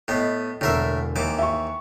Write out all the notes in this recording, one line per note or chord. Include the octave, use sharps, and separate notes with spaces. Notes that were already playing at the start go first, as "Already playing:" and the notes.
A2 B3 D#5
E1 A2 D3 A#4 E5
D#2 E3 D6
E5 C#6